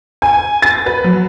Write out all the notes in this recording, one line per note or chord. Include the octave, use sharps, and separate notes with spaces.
G#5
A6
B4
F#3